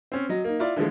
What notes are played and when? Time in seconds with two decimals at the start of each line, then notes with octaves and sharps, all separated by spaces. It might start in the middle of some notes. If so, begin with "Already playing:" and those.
0.12 C4 C#4
0.29 F#3 D#5
0.44 A#3 D#4
0.59 E4 F4 D5
0.76 D3 E3 F3 G#3 A3